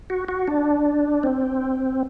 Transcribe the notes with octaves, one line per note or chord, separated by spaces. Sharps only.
F#4
F#4
D4
C4